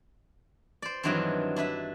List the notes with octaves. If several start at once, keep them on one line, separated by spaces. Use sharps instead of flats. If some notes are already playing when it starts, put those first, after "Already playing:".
C5 D5
G2 D#3 E3 F#3 C4 D4
D4 E4 B4 E5